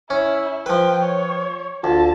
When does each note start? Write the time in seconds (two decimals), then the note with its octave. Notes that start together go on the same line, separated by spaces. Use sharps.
0.10 C#4 E4
0.66 F3 B4 G5
1.05 C#5
1.84 D2 F4 A5